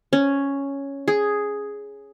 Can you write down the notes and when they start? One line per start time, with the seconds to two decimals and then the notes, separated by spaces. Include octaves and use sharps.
0.13 C#4
1.08 G#4